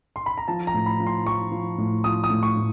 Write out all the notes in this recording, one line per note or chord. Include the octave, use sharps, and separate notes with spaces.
C6
B5
A#5
F3 A5
A#5
A2
B5
F3
C6
F3 C#6
F3
A2
F3 D#6
D#6
A2
C#6
A2